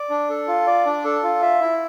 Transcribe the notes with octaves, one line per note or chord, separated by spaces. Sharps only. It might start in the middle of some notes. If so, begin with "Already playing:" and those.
Already playing: D5
D4
A4
F4
D5
D4
A4
F4
E5
E4